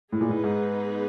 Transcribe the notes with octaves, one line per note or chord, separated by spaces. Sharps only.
A2 B3 D#4 G#4 B4
A#2
A2
G#2